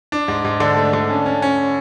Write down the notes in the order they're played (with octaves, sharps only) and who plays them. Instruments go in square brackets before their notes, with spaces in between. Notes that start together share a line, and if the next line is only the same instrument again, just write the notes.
[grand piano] D4
G#2
G#2
[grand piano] D3 [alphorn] D4
[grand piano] A3
D3
[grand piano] C#4 [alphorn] D4
[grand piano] C#4
C#4